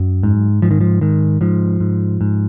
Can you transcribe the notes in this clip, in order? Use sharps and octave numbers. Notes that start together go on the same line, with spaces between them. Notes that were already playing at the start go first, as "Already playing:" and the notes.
Already playing: F#2 F#3
G#2
G#2 F3
D#3
F3
G#2 D#3
G#2 F3
G#2
G#2